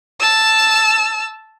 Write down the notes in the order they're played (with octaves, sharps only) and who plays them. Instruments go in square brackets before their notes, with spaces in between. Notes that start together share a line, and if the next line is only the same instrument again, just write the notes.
[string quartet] A5 E6